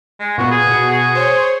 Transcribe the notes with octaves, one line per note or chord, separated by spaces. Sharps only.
G#3
A#2 B3 F#4
G#4
B2 F#4
G#4
C5 C#5